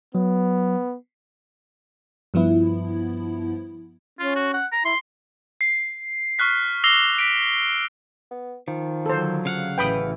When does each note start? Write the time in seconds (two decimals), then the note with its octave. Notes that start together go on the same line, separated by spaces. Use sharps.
0.15 F#3 B3
2.34 G2 F3 B3 E4
4.19 C#4 F4
4.35 F#4
4.53 F#5
4.72 A#5
4.85 E4 C6
5.61 C7
6.39 C#6 F6 F#6 B6
6.84 D6 E6 A#6 C7 F7 G7
7.19 B6 D7
8.31 B3
8.68 D#3 F3
9.06 D3 F#3 A4 C5
9.45 C#3 F5 F#5
9.78 A1 E3 B4 G5 B5 D#6